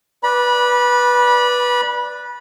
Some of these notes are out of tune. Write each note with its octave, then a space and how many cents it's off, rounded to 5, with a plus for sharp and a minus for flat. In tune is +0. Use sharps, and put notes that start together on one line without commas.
B4 -10 D5 +0 B5 -25